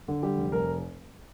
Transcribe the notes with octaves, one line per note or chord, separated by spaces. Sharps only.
D3
G3 G4
F1
F1 A#4